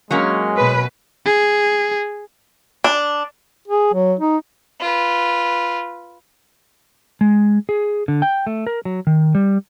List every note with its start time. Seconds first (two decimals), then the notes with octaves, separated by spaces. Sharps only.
0.11 F#3 G#3 A#3 C#4
0.57 B2 B4
1.26 G#4
2.84 D4
3.68 G#4
3.94 F#3
4.20 D#4
4.80 F4 B4
7.21 G#3
7.69 G#4
8.08 D3
8.22 G5
8.47 A3
8.67 A#4
8.85 F#3
9.07 D#3
9.35 G3